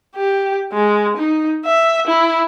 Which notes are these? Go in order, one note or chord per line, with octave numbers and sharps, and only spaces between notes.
G4
G#3
D#4
E5
E4